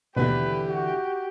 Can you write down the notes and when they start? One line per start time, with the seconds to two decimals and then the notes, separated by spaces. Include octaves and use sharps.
0.17 D#2 B2 D3 E3 A3 G4 B4
0.69 F#4